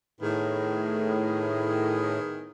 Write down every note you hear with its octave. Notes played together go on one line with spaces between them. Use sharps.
A2 D#3 B3 G#4